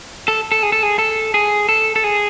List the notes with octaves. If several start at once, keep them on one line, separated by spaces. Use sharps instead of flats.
A4
A4
G#4
A4
G#4
A4
G#4
A4
A4
G#4